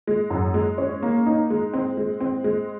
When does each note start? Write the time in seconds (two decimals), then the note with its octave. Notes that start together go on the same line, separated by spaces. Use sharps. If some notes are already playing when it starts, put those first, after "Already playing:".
0.07 G#3
0.30 F#2
0.54 G#3
0.78 C#4
1.02 A#3
1.26 D#4
1.50 G#3
1.74 C4
1.97 G#3
2.20 C4
2.44 G#3